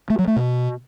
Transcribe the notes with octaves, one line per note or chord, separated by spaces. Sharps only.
A3
F#3
A3
B2